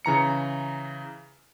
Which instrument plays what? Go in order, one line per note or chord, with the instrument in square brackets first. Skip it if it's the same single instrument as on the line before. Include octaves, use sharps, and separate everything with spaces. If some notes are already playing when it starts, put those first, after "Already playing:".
[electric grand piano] C#3 E3 A#5 C#7